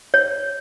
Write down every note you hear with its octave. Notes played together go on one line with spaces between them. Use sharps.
C#5